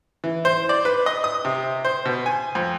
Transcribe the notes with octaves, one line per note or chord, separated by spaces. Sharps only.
E3
C5
D5
B4
D#5
D#6
C3
C5
B2
G#5
F2